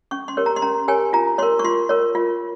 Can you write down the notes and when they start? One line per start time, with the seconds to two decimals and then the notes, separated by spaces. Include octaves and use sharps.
0.11 C#4 C#6
0.28 C6
0.37 G4 A#4 C#5
0.46 A#5
0.56 C6
0.62 C#4 A#5
0.88 G4 A#4 C#5 G#5
1.13 F4 A#5
1.38 A#4 C#5 C6
1.59 C#6
1.65 F4 C6
1.89 A#4 C#5
2.15 F4